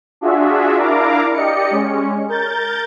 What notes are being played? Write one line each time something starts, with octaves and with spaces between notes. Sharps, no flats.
D4 F4 F#4 G#4 E5
D4 E4 A#4 F5 A#5 D6
G4 D5 D#5 C#7
G#3 C#4
A#4 G6 A6